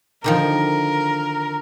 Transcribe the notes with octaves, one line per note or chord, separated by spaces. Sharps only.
D3 D#3 F3 A#4